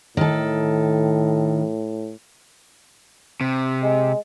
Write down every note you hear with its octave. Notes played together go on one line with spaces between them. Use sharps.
A2 D#3 A4
C3
G#3